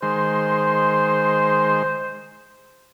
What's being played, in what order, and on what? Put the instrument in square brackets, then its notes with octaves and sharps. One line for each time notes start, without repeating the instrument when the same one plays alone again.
[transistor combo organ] D#3 G#3 C6 [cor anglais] C5